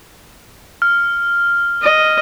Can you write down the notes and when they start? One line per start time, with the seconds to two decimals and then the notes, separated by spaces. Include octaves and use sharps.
0.82 F6
1.82 D#5